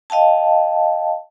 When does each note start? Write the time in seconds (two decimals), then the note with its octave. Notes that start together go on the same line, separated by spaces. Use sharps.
0.10 D#5 F5 G5 A5